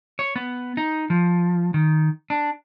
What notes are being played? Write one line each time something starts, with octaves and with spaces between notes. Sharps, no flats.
C#5
B3
D#4
F3
D#3
D4